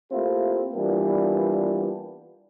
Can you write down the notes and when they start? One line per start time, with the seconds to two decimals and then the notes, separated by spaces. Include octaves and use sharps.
0.12 A3 A#3 C4 E4 F4 G4
0.74 E3 G3 A#3 B3 D4 F4